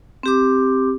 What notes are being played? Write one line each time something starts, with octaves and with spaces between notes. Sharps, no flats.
C4 G4 D6